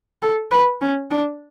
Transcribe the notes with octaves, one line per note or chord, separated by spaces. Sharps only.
A4
B4
C#4
D4